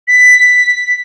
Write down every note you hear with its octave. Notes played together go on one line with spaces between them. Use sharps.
B6